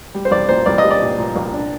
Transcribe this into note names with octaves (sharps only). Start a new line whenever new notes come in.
G3
C5
C2 D5
A#2 C5
C2 D5
G3 D#5
D5
A#2
A#2
C2
D4